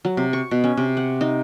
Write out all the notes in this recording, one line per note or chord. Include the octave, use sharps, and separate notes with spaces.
F#3
C3
C#6
B2
C#4
C3
F#5
D#4